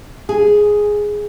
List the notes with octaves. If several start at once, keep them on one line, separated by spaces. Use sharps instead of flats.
G#4